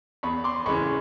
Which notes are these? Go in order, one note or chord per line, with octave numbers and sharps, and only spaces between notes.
E2 B5 C#6
C6 D6
C#3 E3 G#3 B5 C#6